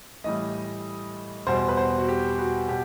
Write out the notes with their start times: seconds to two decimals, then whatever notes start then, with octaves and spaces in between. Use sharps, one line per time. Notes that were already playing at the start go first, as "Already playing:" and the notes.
0.24 A2 E3 G3 D#5
1.47 E2 B2 G3 C5
1.68 B4
1.77 C5
1.98 F#4
2.08 G4
2.38 F#4
2.69 B2 G4